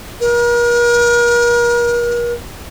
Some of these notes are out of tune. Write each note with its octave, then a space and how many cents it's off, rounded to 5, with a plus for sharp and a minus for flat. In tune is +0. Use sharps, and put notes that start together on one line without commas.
A#4 +40